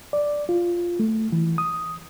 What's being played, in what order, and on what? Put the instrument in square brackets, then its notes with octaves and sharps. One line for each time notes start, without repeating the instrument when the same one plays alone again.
[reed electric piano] D5
F4
A3
E3
D#6